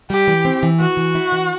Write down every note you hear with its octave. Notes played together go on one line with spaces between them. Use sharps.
G3 G4
E3
C4
E3
B3 F#4
E3
E4
E3